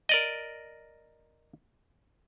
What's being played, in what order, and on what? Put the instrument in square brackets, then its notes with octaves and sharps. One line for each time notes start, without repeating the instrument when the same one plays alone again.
[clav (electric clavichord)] A#4 D5 D#5